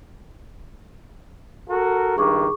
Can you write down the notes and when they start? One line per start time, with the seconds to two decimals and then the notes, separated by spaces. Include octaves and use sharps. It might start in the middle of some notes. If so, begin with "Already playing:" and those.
1.69 F#4 A4 A#4
2.17 C#2 G2 D#3 G#4 C#6 D6